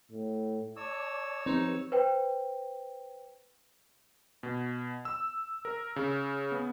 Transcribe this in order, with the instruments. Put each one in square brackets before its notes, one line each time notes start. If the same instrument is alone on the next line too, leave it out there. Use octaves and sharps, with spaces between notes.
[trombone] A2
[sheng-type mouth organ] C#5 E6 [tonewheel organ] D5 A5 D6
[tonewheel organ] F3 G4 B4 [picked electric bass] C4 [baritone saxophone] D#4
[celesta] B4 C5 G5
[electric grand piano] B2
E6
A#4
C#3
B3